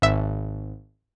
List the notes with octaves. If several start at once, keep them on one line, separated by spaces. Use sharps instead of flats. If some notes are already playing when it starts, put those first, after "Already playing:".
G#1 E5